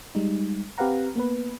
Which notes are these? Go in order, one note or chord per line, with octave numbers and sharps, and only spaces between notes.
G3 G#3 D#4
C4 G4 B4 F5 F#5 A#5
A#3 B3 B4